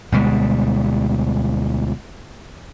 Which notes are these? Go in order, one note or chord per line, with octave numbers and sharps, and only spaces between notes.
D2 B2 G3 G#3